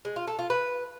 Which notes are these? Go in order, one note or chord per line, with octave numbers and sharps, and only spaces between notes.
G#3
F4
A4
F4
B4